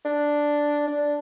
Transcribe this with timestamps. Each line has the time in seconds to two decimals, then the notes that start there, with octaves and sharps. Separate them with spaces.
0.05 D4
0.87 D4